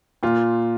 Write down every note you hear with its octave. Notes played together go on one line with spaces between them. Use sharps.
A#2 F4